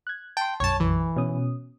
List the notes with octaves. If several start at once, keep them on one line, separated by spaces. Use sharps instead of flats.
F#6 G#6
G5 A5 C6
B1 F#2 C#5 A5
E3
B2 C#4 D#6